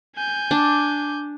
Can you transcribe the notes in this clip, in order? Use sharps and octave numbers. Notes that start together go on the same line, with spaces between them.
G#5 G6
D4